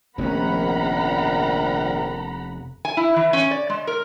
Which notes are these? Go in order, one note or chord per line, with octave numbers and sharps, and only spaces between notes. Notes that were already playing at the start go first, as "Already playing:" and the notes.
F1 A#1 D#3 B3 C#4 F#5 A#5 B5
G#5
E4
E3
C#4
D5
G#3
A#4